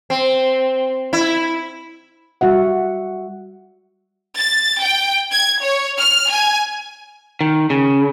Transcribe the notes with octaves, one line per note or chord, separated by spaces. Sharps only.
C4
E4
G3 F#4 E5 F#5
A6
G5
G#6
C#5
F6
G#5
D#3
C#3